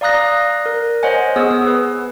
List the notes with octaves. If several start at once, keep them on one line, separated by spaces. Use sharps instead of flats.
D5 F5 A#5 D#6 F#6 A#6
A#4
C5 C#5 D#5 F#5 G#5
B3 G#4 D#6 E6
B4